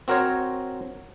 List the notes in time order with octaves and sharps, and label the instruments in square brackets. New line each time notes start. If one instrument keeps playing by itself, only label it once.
[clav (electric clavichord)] C4 F#4 A#4 C5 C#5